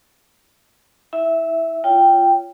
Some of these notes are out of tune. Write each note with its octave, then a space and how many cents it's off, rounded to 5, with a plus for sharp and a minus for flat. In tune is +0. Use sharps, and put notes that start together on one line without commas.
E4 -25 E5 +0
F4 -15 C#5 +25 G5 +0